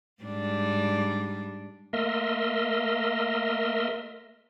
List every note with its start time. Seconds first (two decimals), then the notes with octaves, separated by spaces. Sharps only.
0.23 G#2 G3 D4
1.93 A3 A#3 A#4 D#5 E5 C6